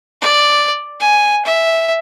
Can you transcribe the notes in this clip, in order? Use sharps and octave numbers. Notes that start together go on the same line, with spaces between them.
D5
G#5
E5